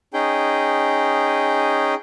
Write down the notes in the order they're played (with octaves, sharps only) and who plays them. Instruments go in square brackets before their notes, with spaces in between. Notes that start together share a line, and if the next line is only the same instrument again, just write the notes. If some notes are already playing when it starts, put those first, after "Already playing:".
[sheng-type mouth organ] C#4 D#4 G#4 G5